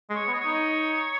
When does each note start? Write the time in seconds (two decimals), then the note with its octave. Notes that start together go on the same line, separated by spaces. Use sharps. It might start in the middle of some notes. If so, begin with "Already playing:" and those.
0.10 G#3
0.16 C#5
0.28 B3
0.33 D#5
0.40 C#5
0.46 D#4